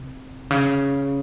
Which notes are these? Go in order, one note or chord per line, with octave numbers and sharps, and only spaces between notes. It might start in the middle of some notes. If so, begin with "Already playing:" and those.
Already playing: C3
C#3